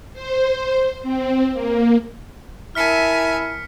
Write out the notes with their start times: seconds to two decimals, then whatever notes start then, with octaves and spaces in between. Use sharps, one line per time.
0.13 C5
1.03 C4
1.53 A#3
2.75 E4 A#4 E5 G#5 A5 F6 B6 C#7